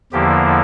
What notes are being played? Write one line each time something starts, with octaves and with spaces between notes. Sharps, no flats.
E2 D3 F3 A#3 E4 G4